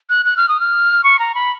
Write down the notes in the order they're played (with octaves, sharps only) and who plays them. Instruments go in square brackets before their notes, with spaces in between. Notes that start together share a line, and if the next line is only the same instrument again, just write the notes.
[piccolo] F#6
F#6
F6
D#6
F6
C#6
A#5
B5